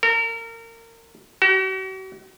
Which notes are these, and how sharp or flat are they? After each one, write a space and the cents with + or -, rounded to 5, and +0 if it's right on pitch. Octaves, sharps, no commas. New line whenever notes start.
A#4 -30
F#4 +45